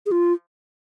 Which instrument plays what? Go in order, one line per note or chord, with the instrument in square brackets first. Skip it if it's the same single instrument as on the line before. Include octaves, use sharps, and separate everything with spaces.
[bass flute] G#4
F4